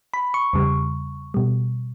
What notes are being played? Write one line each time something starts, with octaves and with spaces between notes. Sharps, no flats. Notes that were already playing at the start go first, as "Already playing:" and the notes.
B5
C#6
E2 C#3 G3
B2 G3